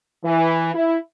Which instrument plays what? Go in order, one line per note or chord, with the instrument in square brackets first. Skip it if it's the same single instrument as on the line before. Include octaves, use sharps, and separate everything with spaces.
[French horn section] E3
E4